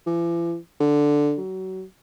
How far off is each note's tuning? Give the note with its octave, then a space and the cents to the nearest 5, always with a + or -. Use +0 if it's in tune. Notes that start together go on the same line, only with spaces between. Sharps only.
E3 +45
D3 +0
F#3 +25